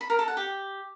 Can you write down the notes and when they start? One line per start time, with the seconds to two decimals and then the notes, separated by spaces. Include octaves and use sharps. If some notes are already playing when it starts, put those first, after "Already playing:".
0.01 B5
0.10 A#4
0.19 A4
0.28 F#5
0.37 G4